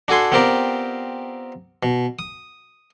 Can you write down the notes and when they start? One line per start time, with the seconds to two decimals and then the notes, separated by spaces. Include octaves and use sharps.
0.08 D4 F#4 A4 G#5 C6
0.32 B3 C4 F4 G4 A#4 D5
1.83 B2
2.19 D#6